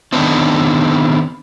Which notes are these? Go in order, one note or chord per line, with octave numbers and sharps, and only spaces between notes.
D3 D#3 B3 C4 D4 D#4